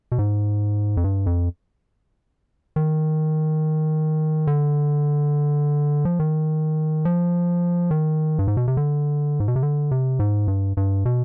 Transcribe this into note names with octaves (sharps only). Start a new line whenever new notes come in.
B2
G#2
F2
G2
F2
D#3
D3
F3
D#3
F3
D#3
G2
G#2
B2
C3
D3
G#2
B2
C3
D3
C3
G#2
G2
G2
B2